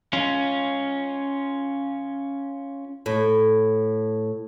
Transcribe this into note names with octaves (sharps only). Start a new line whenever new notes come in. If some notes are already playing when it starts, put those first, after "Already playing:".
C#4 F4
A2